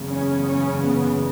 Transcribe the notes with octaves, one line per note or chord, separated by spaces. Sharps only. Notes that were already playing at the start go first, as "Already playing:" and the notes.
Already playing: F#1 E2 C#3
C#4
C#4
B3